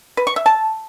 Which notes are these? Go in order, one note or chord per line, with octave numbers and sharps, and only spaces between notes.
B4
C#6
E5
A5